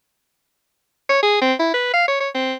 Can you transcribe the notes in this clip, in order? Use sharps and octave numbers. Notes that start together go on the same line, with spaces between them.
C#5
G#4
C4
E4
B4
F5
C#5
C#5
C4